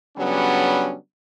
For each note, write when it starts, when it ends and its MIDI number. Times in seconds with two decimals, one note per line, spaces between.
0.17 0.94 49
0.17 0.94 54
0.17 0.94 55
0.17 0.94 59
0.17 0.94 61
0.17 0.94 62